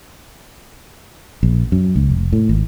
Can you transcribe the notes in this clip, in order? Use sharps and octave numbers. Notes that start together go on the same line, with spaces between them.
A#1
F#2
C#2
F1
A2
G#1